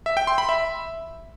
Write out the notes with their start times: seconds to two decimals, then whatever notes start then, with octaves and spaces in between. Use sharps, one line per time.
0.06 E5
0.17 G5
0.27 C6
0.38 B5
0.49 E5